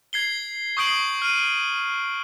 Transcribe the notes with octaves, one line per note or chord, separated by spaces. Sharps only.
G#6 C7 G7
C#6 D#6 G6 C7 D7 F#7
F6 D#7